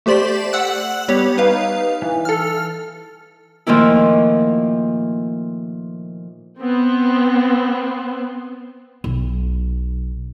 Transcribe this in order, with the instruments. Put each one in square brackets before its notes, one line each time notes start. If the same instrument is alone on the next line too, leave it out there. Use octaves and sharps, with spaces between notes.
[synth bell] A3 G4 C5 D5 C6 B6
F#5 E6 F#6
G3 B3 G4 C#5
D#4 B4 F5
E3
A4 F6
[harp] A#2 D#3 F3 A3 A#3 E4
[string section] B3 C4
[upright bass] B1